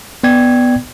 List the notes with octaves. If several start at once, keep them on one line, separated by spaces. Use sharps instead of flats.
B3 D5 G5 G#6